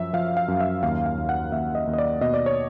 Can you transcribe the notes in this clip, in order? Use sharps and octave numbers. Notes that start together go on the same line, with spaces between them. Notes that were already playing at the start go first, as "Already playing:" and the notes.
Already playing: F#2 F3 E5
F3 F5
F5
F#2
E5
D#2 F5
F5
D#2
F#5
D#2 E5
D#5
D#2
D#5
D5
B2 D#5
D5
C#5